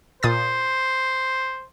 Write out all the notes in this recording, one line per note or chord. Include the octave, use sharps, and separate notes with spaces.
A#2 C5 D#6 A6